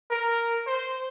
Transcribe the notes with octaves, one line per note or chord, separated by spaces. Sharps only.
A#4
C5